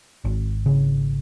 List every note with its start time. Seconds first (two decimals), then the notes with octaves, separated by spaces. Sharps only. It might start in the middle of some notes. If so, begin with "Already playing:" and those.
0.25 G#1
0.66 C#3